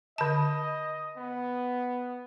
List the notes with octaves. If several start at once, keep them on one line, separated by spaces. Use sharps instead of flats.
D3 D#5 A5
B3